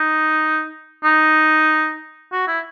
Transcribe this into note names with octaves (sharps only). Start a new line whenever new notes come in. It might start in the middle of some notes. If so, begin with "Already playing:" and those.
Already playing: D#4
D#4
F#4
E4